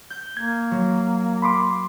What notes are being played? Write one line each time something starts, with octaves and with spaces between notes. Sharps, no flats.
G6
A#3 G#6
F#3
B5 C6 D6